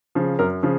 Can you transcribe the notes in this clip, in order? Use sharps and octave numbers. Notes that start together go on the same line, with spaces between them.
C#3 F3
F#2 A#4
C#3 F3